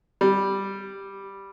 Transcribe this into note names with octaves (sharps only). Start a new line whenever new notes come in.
G3